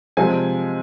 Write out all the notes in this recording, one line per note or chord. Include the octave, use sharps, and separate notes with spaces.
C3 F3 G#3 G#5